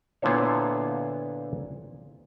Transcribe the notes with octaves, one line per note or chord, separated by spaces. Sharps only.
A#2 D3 B3 E4 C5 C#5